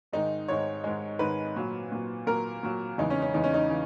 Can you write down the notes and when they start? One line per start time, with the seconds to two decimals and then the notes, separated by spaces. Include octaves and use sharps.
0.12 G#2 D#3 G#3 D#4
0.48 G#2 D#3 G#3 C#5
0.84 G#2 D#3 G#3
1.19 G#2 D#3 G#3 B4
1.56 A#2 F#3
1.92 A#2 F#3
2.27 A#2 F#3 A#4
2.63 A#2 F#3
2.98 E2 C#3 E3 G#3 D#4
3.10 C#4
3.22 C#4
3.34 E2 C#3 E3 G#3 D#4
3.44 C#4
3.54 D#4
3.70 C#3 E3